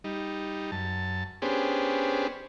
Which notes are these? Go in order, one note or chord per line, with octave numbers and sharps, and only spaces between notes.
G3 D#4
F#2 A5
B3 C#4 D4 G4 G#4 C5